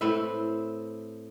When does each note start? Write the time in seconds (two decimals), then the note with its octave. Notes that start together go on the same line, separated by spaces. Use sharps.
0.01 A2 C4 B4 E5